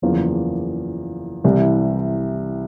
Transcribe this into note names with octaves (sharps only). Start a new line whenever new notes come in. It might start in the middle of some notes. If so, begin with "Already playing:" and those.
F#1 E2 C#3 F3 A#3
C2 C3 E3 G3